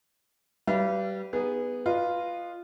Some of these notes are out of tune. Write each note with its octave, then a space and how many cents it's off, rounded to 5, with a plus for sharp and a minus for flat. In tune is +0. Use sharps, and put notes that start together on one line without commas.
G3 -25 B4 +0 F5 -40
B3 +0 D#4 +0 G#4 -20
F4 -5 B4 -10 D#5 -25